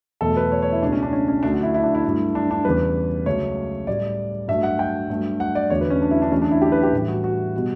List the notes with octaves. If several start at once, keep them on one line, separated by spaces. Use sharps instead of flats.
E2 B2 F#3 A3 A4
B4
C#5
C#5
E4
C#2 B2 F#3 A3 D4
C#4
D4
C#4
C#4
D2 D3 F#3 A3 D4
F#4
E4
E4
D4
E4
G2 F#3 A3
D4
D4
E2 C#3 G3 B4
C#2 C#3 F#3 A3 C#5
A2 G3 D5
G2 F#3 A3 E5
F#5
G5
G2 F#3 A3
F#5
D5
E2 D3 F#3 A3 C#5
B4
C#4
D4
E4
D4
E2 D3 F#3 A3 C#4
D4
E4
G4
B4
G4
A2 E3 G3
F#4
F#4
B2 G3